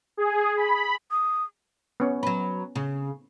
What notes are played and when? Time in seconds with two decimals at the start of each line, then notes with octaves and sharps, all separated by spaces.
0.17 G#4
0.57 B5
1.11 D#6
2.00 B3 C#4
2.23 F#3 B4
2.76 C#3